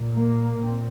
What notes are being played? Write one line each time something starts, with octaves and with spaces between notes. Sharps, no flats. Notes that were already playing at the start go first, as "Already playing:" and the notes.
Already playing: A#2
A#3
A#2 C4